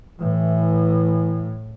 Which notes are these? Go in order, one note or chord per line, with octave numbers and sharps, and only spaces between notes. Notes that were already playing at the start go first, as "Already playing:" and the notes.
A2 E3